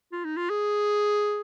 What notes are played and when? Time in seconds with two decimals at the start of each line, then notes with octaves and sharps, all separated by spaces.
0.12 F4
0.25 D#4
0.37 F4
0.50 G#4